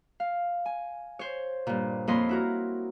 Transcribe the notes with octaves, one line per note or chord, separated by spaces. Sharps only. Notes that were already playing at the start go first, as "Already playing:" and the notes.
F5
G#5
C5 C#5
G2 A#2
F2 A#3 C#5 D#5 B5 C6
E4 F#4 A#4